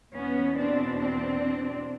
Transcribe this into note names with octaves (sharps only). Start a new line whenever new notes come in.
E2 B2 B3 C#4
C4 D4
C4 D4